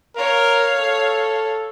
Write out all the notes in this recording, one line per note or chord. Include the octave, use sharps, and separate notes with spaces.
A#4 C#5 F5
A4